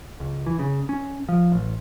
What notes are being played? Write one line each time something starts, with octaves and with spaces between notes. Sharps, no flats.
C#2
E3
C#3
C#4
F3
A1